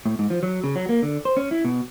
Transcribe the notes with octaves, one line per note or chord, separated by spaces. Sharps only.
A2
G#2
F3
F#3
C#3
F#3
A#3
D3
C5
C#4
E4
B2